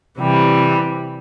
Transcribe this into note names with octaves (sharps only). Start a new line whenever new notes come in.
C3 E3 G3